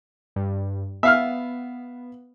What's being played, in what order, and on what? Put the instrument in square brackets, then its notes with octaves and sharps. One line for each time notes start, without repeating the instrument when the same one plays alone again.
[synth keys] G2
[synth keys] B3 [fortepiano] E5 F5 F6